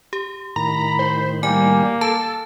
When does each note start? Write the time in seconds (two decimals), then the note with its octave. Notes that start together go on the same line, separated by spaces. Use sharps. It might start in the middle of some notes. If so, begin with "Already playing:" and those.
0.13 G4
0.56 A2 D#3 A#5 B5
0.99 C5
1.43 G3 A#3 G#5
2.01 A4 A5